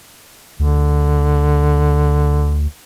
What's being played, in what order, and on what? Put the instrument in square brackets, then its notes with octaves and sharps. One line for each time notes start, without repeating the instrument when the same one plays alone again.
[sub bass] D2 [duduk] D3